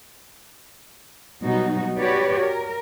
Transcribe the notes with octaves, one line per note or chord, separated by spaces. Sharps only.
B2 F#3 G3 D#4 F#4
F#4 G4 B4 C#5 D5
A#4